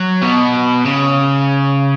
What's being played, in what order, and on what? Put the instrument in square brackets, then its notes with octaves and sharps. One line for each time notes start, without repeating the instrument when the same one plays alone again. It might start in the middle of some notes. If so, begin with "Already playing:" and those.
Already playing: [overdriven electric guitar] F#3
B2
C#3